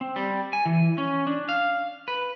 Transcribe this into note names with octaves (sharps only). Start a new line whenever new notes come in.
C4
G3
G#5
E3
C#4
D4
F5
B4